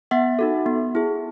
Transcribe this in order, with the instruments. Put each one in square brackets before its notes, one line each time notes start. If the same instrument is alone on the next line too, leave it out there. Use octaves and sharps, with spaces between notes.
[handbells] B3 E5 F#5
D#4 F#4 A4
B3
E4 G#4